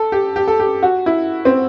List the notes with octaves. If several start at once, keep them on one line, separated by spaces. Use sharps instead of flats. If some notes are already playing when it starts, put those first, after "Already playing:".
Already playing: A4
G4
G4
A4
G4
F#4
E4
C4